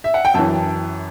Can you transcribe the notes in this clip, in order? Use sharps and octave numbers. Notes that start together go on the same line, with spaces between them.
E5
F#5
G5
F#2 E3 A5